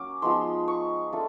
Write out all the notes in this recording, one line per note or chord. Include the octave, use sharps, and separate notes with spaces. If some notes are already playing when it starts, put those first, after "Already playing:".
Already playing: F#3 A#3 C#4 D6
F3 G#3 B3 D#4 C6
C#6
A3 D4 F4